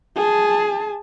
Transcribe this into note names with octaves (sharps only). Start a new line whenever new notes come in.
G#4 A5